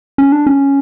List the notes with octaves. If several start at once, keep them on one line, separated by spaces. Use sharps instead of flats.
C#4
D4
C#4